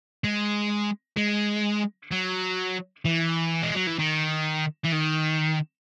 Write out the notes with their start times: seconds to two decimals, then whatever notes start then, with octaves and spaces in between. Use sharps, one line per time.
0.24 G#3
1.17 G#3
2.12 F#3
3.05 E3
3.63 G#3
3.75 F#3
3.87 E3
3.99 D#3
4.85 E3
4.93 D#3